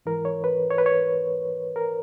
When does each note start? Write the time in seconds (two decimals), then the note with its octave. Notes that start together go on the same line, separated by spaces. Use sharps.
0.06 G#2 E3 A#4
0.25 C#5
0.44 B4
0.70 C#5
0.78 B4
0.86 C#5
1.76 A#4